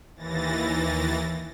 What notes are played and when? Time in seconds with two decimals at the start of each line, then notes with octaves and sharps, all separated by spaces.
0.16 D#2 E3 A6 A#6